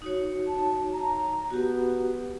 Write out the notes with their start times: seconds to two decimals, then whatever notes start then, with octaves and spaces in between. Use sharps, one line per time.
0.02 D#4 F#4 C#5
0.47 A5
0.93 A#5
1.51 B3 F#4 G4